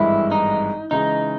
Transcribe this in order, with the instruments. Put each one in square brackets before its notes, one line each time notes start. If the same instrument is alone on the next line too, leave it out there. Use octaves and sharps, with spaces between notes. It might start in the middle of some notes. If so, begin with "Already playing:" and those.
Already playing: [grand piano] G#1 G2 E3 G#3 [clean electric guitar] E4
[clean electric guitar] D#4
[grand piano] C#3 E3 G#3 [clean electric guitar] D#4